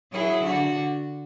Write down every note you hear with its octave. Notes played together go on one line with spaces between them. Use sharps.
F#3 E4 G#4
D3 D4 F#4